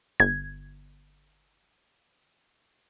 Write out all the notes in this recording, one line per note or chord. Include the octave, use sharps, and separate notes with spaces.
G1 G#6